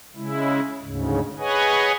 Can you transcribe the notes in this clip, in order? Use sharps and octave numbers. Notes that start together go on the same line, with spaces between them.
C#3 G#3 E4
D2 G#2 C#3
G#4 B4 C#5 D#5 F#5 G#5